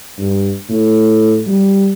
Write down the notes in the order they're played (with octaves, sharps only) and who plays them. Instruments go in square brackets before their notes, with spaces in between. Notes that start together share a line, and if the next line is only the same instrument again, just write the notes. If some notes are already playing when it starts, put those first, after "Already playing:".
[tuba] G2
A2
G3